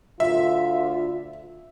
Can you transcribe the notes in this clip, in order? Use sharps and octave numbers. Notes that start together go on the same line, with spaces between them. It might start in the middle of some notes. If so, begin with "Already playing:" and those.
D2 D3 F4 E5